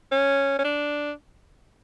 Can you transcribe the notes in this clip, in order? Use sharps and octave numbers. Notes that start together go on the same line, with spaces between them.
C#4
C#4
D4